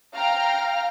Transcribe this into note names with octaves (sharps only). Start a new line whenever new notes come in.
F5 G5 A#5 F6